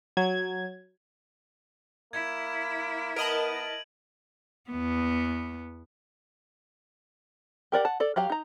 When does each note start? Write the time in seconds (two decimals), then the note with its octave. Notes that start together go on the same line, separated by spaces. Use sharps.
0.17 F#3 G#6
2.13 A#3 E4 G#6
3.16 B3 A#4 D#5 A5 D7 D#7 F#7
4.70 E2 B3
7.72 G4 A#4 D5 F#5
7.85 F#5 A5
8.00 A4 D5
8.16 F#3 G4 F5 A#5
8.30 D#4 A#5